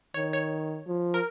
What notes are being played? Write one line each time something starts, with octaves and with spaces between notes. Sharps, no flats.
D#3 C#5
C#5
F3
A#4